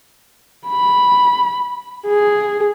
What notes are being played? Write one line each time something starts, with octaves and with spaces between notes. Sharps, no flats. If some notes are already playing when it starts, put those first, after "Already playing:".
B5
G#4